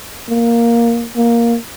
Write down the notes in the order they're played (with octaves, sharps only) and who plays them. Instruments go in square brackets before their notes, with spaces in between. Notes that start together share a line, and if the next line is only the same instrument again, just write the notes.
[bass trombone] A#3
A#3